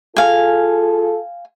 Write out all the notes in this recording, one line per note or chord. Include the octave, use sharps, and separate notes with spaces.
F4 G#4 A4 F5 G#5